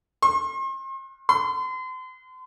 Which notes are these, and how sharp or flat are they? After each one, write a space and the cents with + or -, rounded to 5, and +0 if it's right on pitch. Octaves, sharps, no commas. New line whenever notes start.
C6 +40
C6 -40